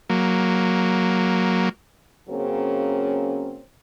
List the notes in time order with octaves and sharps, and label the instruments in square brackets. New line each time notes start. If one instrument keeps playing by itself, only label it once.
[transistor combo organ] F#3 A#3
[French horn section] C#3 F#3 A#3 C4 C#4